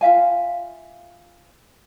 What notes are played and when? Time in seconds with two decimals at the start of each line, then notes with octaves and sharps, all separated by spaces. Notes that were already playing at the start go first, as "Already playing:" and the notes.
0.01 F4 E5 F5 G#5